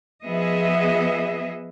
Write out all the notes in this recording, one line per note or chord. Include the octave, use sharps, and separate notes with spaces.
F3 B3 G#4 D#5 E5